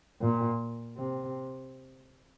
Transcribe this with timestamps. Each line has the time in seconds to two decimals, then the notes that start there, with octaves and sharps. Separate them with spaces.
0.22 A#2
0.97 C3